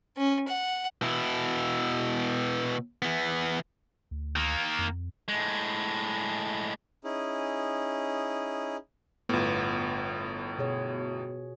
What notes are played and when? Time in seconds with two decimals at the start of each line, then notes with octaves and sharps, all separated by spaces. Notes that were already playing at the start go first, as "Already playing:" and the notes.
0.17 C#4
0.48 F#5
1.02 B2 E4
3.02 E3 B3
4.11 D2
4.36 D#3 A#3
4.79 F2
5.28 A2 G#3
7.04 C#4 D#4 E4 G#4
9.29 G1 A2 B3 F4
10.59 B2 G#4 C#5